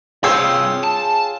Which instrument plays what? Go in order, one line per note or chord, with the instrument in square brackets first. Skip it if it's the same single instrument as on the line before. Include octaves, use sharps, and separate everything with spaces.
[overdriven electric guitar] G2 C3 [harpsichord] F4 C5 C#5 [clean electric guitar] G#4 G5 [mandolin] E6
[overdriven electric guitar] A5